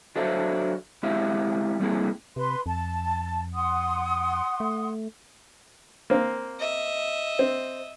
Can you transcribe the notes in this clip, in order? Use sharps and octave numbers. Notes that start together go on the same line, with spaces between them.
F#3 D4 A4 C5 E5 F5
G#3 C4 E4 G4 E5 F5
G3 A3 A#3 C4 E4 G#4
C3 B4 C6
F2 A5
F#5 C6 D#6
A3
A#3 C4
D#5 E5
C4